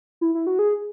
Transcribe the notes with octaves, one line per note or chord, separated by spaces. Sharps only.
E4
E4
F#4
G#4